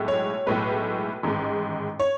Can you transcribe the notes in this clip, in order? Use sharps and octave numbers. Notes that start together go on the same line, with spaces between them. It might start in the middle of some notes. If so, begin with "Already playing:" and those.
Already playing: B1 A2 G#3
C#5
B1 A2 G#3 B4
A1 G#2 D#3 G#3
C#5